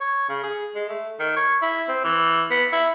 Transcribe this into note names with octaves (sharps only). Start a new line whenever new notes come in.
C#5
C#3
G#4
G#3
A3
D#3
C#5
E4
C4
E3
B3
E4